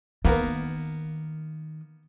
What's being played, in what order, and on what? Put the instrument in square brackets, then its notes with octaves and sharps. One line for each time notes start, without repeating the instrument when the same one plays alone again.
[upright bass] D#3 [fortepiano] A#3 B3 A#4